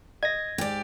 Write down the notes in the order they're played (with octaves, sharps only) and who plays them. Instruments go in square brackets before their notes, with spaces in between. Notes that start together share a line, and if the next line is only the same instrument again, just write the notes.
[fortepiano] D#5 [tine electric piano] G#6 A#6
[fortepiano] G#2 [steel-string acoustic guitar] G4 D5